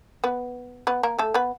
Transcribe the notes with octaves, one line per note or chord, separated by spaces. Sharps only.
B3 B4
B3 B4
A#3 A#4
A3 A4
B3 B4